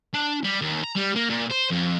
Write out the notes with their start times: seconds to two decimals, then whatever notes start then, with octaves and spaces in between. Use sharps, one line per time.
0.14 D4
0.44 G3
0.61 D#2
0.84 A#5
0.96 G3
1.16 A#3
1.29 A#2
1.50 C5
1.70 F2